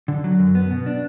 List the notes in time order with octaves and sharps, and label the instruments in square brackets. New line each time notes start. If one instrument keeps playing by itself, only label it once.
[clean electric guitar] D3
F#3
F#2
B3
B2
D4